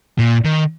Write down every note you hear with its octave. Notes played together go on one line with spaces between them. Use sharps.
A#2
D#3